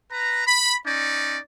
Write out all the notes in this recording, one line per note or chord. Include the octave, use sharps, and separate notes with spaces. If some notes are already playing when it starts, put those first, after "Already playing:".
B4 A#5
B5
C#4 D#4 D5